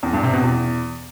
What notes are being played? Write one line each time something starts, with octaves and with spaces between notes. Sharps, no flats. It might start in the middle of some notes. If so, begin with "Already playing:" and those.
E2
G2
C3
B2
E2